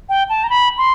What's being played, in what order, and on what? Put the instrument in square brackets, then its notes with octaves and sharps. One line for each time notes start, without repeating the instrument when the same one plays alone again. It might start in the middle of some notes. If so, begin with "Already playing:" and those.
[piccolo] G5
A5
A#5
B5
C6